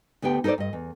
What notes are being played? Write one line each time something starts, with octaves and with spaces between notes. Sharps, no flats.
D2 D3 B3 G4 G5
D#4 A4 A#4 C5 D5
G2 D#5
E2